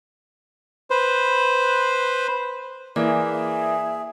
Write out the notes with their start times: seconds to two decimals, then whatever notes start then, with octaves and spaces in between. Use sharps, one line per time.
0.90 B4 C5
2.96 E3 A#3 G#4 D5 E5